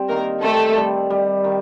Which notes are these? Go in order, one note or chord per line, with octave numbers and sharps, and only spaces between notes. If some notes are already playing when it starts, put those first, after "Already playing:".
Already playing: G3 C4
D#3 A#3 A#4
A3 C4 A4
G3
G3
D#3